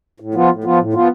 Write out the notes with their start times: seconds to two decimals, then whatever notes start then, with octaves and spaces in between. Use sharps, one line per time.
0.20 A2
0.34 F3 B3 F4
0.50 A2
0.64 F3 B3 F4
0.79 A2
0.93 F3 B3 F4